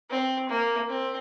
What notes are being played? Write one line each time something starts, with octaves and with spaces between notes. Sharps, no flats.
C4
A#3
C4